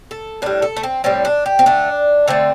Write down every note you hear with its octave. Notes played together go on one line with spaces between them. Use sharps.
A4
A2 G3 D4
A4
A3
C4
A2 G3 C4
D4
G4
C4
D3 A3 D4
D3 A3 C4